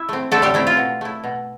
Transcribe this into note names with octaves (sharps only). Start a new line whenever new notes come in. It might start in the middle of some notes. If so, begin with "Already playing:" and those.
Already playing: E4 E5
A3 C4
D3 A3 A4
G3 G4
A3 C4 E4
F4
B2
A3 E4
B2